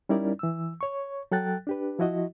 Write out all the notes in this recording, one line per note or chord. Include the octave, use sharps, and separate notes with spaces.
G3 C#4 D#4 E4 A#4 D5
E3 E6
C#5 C#6
F#3 A4 G5 F#6 A6
D4 G4 B4
F3 E4 F#4 D#5